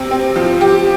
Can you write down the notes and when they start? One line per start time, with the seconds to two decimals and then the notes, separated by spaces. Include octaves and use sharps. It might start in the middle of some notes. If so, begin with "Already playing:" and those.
Already playing: C3 C4
0.11 C4
0.36 F3
0.61 G4